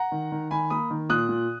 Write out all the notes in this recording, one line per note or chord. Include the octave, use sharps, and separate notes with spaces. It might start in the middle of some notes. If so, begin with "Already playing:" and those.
Already playing: F#5 A#5
D#3
D#3
D#3 G#5 B5
A#3 B5 D#6
D#3
A#2 D#6 F#6
A#2